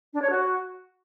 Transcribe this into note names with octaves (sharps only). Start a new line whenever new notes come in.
D4
C#5
F#4